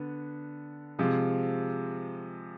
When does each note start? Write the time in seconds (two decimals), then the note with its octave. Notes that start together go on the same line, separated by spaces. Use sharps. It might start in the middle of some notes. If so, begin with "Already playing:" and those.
Already playing: D3 B3
0.99 C3 F3 G#3